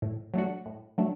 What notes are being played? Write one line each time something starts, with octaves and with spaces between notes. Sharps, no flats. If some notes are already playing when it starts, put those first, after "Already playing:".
A2
F#3 A3 D4 F#4
A2
F#3 A3 D4